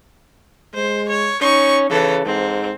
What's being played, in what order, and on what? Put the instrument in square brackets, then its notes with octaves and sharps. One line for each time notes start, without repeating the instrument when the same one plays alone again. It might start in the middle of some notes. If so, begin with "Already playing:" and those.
[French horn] G#3 [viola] C5
[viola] C#5
[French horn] C#4 [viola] D#4 C#6
[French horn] C#3 [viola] E3 A4
[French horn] G#2 [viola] C4